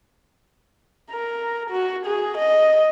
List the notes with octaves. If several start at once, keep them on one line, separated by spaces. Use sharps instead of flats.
A#4
F#4
G#4
D#5